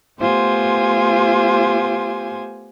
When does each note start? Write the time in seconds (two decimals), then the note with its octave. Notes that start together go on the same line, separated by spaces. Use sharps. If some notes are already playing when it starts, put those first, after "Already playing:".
0.20 A3 B3 F4 G4 C5 G#5